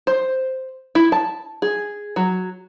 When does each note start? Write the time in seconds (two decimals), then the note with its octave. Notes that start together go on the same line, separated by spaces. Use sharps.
0.07 C5
0.95 E4
1.12 A5
1.62 G#4
2.16 F#3